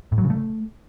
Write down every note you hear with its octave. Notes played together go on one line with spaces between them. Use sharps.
A2
F#3
C#3
A3